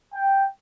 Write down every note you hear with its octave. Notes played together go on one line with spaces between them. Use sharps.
G5